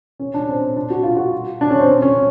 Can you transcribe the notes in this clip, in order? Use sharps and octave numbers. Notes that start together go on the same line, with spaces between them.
C#4
D4
C4
D4
F#4
F4
F#4
D4
C#4
C4
C#4